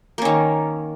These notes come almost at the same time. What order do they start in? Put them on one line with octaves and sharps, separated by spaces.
A#3 C#4 D#3